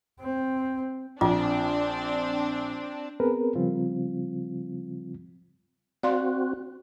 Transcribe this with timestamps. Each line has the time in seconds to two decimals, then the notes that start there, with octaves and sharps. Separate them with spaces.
0.20 C4
1.21 A#1 C4 D4 F4 D6
3.20 B3 C4 G#4 A#4 B4
3.55 C#3 F3 G3 C4 F4
6.03 C4 F#4 D5 F5 C6